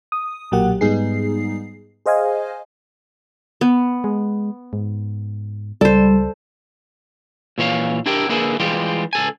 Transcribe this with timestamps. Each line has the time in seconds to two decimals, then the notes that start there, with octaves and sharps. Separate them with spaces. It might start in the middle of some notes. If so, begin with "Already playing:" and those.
0.12 D#6
0.51 B1 A#2 F#3 A#3 G4 F#5
0.81 G#2 G3 B3 D#4 G#4 C7
2.06 G#4 C5 D#5 F5 G#5
3.61 B3
4.04 G#3
4.73 G#2
5.81 C#2 G3 A4 C5
7.58 A#2 E3 C#5 F5
8.06 D4 E4 G4 A#4 G5
8.29 D3 A#3 E4 G#4 B4
8.60 E3 G3 G#3 F4 G4
9.13 C#2 A4 G#5